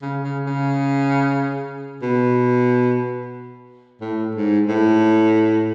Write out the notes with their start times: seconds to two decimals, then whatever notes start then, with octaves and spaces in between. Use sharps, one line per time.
0.02 C#3
0.24 C#3
0.47 C#3
2.02 B2
4.01 A2
4.35 G#2
4.68 A2